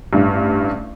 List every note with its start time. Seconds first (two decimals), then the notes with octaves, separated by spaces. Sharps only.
0.13 A1 G2